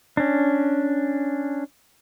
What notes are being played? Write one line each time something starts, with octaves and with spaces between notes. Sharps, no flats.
C#4 D4